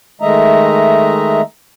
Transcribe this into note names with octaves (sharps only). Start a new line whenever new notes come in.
D#3 G#3 A3 D#5 E5 A#5